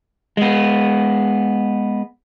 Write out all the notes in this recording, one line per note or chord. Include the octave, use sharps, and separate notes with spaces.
G#3 B3